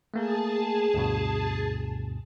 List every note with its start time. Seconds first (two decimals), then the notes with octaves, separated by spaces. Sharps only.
0.14 A3 A#3 G#4 A#4 A5
0.94 D2 G2 B2